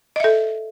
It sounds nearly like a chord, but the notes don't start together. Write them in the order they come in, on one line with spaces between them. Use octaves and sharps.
D#5 E5 A4